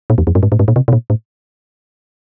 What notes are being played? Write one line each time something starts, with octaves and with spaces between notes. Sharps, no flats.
A#2
E2
F2
G2
G#2
A2
G#2
A#2
C3
B2
A#2
A2